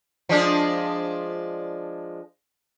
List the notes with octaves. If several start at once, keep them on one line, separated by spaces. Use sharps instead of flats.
F3 G#3 D4